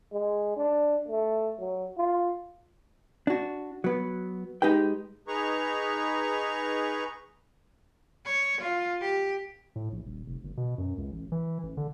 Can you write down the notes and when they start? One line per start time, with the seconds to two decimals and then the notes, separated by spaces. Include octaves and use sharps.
0.12 G#3
0.56 D4
1.08 A3
1.59 F#3
1.97 F4
3.27 D4 F#4
3.84 F#3 B3
4.62 G#3 D#4 G4 B4 G5
5.28 D#4 G#4 B4 A#5 C#6
8.25 C#5
8.61 F4
9.01 G4
9.76 A2
9.92 A#1
10.05 D#1
10.26 F1
10.44 G1
10.57 B2
10.78 F#2
10.97 C#2
11.12 A1
11.32 E3
11.63 A1
11.77 D3